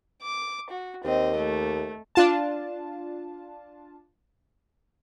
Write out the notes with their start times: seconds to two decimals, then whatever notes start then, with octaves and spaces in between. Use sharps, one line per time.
0.22 D6
0.70 F#4
1.04 D#2 C4 D#5
1.36 A3
2.15 D4 F4 A5